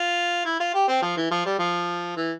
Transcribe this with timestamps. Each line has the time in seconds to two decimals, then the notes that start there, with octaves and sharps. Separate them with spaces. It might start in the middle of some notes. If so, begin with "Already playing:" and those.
Already playing: F4
0.45 E4
0.60 F4
0.74 G4
0.88 C4
1.02 F3
1.17 E3
1.31 F3
1.46 G3
1.59 F3
2.17 E3